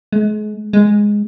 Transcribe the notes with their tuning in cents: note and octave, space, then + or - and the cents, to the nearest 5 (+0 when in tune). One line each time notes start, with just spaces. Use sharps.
G#3 +35
G#3 -5